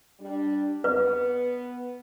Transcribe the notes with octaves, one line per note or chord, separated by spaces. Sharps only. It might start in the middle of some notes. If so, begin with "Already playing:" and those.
G3 D4
B3 B4